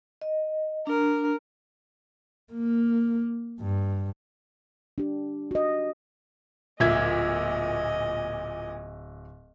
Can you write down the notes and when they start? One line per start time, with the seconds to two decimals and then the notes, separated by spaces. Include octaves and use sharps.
0.22 D#5
0.87 D4 A#4
2.53 A#3
3.61 G2
4.98 D4 G4
5.51 F#4 D#5
6.80 D1 A#2 D#5 E5 G#5 G#6